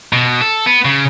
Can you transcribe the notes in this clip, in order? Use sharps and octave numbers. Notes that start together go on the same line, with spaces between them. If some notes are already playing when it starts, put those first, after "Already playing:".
B2
A4
B3
C#3